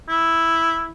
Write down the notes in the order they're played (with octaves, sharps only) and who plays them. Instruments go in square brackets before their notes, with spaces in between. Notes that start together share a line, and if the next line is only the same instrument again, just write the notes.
[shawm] E4